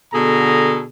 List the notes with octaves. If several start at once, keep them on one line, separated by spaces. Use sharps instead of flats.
B2 D3 G#4 A4 A#5